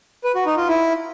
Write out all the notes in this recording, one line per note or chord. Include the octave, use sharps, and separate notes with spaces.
B4
F#4
D#4
F4
E4